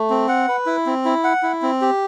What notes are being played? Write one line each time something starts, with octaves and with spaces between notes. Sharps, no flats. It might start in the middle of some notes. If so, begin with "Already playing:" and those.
Already playing: A3
C4
F#5
B4
E4
C4
E4
F#5
E4
C4
G4